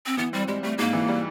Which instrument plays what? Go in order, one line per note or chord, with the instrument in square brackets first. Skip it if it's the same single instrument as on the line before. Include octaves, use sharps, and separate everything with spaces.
[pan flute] C4
[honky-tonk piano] E3 [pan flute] B3
[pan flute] G3 [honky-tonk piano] C4
[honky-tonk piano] G3 [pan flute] G#3
[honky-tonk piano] G3 [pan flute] A3
[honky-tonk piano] G#2 [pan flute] A#3
[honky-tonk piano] E3
G3